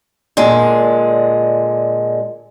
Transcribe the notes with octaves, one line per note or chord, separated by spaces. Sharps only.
A#2 D3 G#3